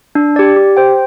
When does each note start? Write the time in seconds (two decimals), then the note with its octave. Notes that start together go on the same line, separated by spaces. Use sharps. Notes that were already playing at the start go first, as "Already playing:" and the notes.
0.15 D4
0.36 G4 D5
0.57 G4
0.77 C5 G5